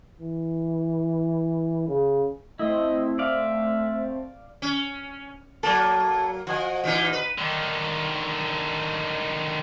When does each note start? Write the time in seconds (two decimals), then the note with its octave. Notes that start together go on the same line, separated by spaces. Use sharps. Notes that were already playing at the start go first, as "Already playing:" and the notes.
0.19 E3
1.87 C#3
2.59 A3 C4 E4 C5 D#5
3.19 D5 E5 F5
4.62 C#4
5.63 F#3 A#3 A4 D5
6.47 F3 F#4 D#5 G#5
6.84 A#2 E3 D#4
7.13 B4
7.38 D3 D#3